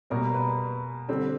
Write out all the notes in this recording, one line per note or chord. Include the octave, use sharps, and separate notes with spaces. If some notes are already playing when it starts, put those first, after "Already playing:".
B2 G3 A#3 A#4
B4
D3 G3 C4